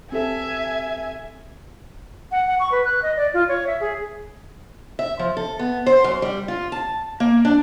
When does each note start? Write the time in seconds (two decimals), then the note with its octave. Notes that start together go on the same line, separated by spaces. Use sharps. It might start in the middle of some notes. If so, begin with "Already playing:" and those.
0.12 C4 G4 A4 E5 G#5
2.32 F#5
2.47 F#5
2.60 C#6
2.71 B4
2.85 F#6
3.02 D#5
3.17 D5
3.34 F4
3.48 C#5
3.67 E5
3.81 G#4
4.99 E5
5.19 F3
5.37 A4
5.59 B3
5.86 C5
6.04 F#2
6.22 G3
6.48 F4
6.72 A5
7.20 A#3
7.45 D4